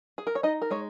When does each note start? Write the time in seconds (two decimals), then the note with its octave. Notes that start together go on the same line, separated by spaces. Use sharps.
0.18 G#4
0.27 A#4
0.35 C#5
0.43 D#4 D#5
0.62 A#4
0.71 G#3 C#5